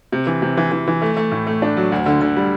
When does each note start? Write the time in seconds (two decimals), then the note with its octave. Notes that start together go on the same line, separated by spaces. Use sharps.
0.12 C3
0.27 E3
0.42 C3
0.57 E3
0.72 E3
0.87 E3
1.02 A3
1.17 A3
1.31 A2
1.47 A3
1.62 D4
1.77 F#3
1.92 D2
2.06 D3
2.21 D3
2.36 G3